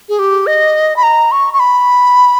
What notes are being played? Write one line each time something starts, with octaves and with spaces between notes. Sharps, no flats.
G#4
G4
D#5
B5
A#5
C#6
C#6
B5